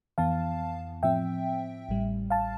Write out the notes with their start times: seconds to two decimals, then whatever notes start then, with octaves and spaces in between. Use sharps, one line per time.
0.18 F2 E3 B3 F5 A5
1.03 A2 F3 C4 E5 G5
1.89 A1 A2 G3
2.30 F5 A5